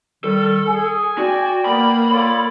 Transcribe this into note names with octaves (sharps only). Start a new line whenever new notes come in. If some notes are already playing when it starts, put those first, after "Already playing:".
D#3 G3 A4
G#4 G#5
F#4 D5 G5
A#3 B3 B5
F4 A4 C#5 D5